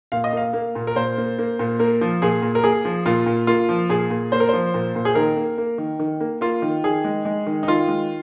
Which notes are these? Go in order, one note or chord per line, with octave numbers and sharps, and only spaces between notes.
A#2 F5
D#5
A#3 F5
A#3
A#2
A#4
A#2 C5
A#3
A#3
A#2
A#3 A#4
F3
A#2 G#4
A#2
A#4
A#3 G#4
F3
A#2 F4
A#2
A#3 F4
F3
A#2 G#4
A#2
A#3 C5
A#4
F3 C5
A#2
A#2
G#4
D#3 A#4
A#3
A#3
D#3
D#3
A#3
A#3 F4
D#3
D#3 G#4
G#3
G#3
D#3
D#4
D#3 F4
G#3